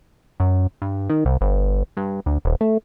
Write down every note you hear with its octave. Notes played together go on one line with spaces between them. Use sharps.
F#2
G2
D#3
C2
G1
G2
D2
D#1
A3